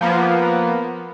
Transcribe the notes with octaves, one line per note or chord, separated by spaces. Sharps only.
F3 A#3 B3